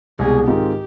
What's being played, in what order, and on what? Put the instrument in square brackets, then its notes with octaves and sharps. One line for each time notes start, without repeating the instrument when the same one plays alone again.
[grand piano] C2 B2 G#3 [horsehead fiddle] G#4
[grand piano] G#2 D#3 G#3 C4 F4 [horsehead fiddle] G4